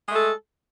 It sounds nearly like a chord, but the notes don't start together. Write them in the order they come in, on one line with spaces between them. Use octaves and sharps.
G#3 A3 A4